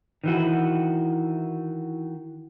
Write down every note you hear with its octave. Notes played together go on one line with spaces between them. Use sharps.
D#3 E3 F#4